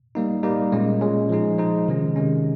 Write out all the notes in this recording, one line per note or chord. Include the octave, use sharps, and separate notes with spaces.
G3 A#3 D#4
G3 A#3 D#4
A#2 G#3 C#4
A#2 G#3 C#4
F3 G#3 D#4
F3 G#3 D#4
C3 D#3 G#3 C#4
C3 D#3 G#3 C#4